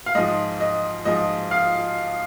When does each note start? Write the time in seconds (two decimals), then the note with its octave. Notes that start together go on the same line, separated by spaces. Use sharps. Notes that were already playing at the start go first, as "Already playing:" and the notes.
0.06 F5
0.15 G#2 F3 D#5
0.60 D#5
1.05 G#2 F3 D#5
1.51 F5